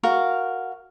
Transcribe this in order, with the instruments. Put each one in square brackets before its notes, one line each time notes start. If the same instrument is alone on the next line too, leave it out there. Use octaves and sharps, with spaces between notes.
[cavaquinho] F#4 A#4 F5